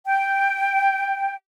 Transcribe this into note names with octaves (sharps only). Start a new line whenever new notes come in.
G5